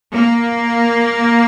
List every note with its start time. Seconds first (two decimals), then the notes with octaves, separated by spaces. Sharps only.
0.13 A#3